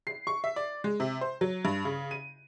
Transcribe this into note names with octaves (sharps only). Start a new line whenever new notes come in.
C7
C#6
E5
D5
G#3
C3
C5
F#3
G2
C#3
D#7